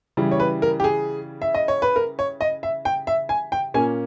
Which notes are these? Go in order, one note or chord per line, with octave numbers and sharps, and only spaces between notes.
C#3 E3 G3
C#5
B4
A#4
G4
G#4
E5
D#5
C#5
B4
A#4
C#5
D#5
E5
G5
E5
G#5
G5
A#2 A#3 C#4 G#5